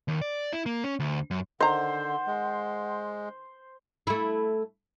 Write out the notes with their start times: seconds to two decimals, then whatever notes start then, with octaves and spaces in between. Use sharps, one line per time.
0.08 D#2
0.22 D5
0.53 E4
0.66 A#3
0.84 C#4
1.00 D2
1.31 F#2
1.60 D3 D#3 C5 F#5 A#5
2.27 G#3
4.07 A3 E4